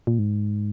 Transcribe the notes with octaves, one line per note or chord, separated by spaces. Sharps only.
A#2
G#2